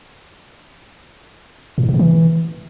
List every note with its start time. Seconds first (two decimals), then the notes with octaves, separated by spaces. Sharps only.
1.78 A2
1.83 G#2
1.89 B2
1.94 C3
1.99 E3